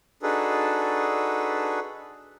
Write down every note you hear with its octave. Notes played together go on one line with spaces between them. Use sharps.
D4 D#4 F#4 G#4 A4 B4